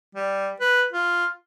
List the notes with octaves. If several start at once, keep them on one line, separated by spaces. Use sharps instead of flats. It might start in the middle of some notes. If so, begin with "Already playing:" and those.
G3
B4
F4